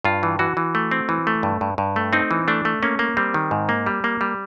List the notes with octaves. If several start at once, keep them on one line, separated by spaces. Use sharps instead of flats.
G2 F4
E3
E3 F#4
E3
A3
C4
E3
A3
G2
G2
G2
A3
C4 D#4
E3
A3 D4
A3
A#3 C#4
A#3
G3 C4
D#3
G#2
A#3
G3
A#3
G3